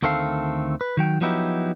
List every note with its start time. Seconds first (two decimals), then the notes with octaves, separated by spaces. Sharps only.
0.02 D2 D#3 A3 C4 A4 F5
0.81 B4
0.97 D#3 F#3 G5
1.21 F3 F#3 B3 D#4 E4 G4